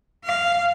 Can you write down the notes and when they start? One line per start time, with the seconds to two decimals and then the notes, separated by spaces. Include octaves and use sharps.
0.24 F5